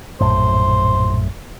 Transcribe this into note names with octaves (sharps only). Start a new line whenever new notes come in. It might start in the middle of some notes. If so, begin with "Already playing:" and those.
A#1 F#2 A2 C5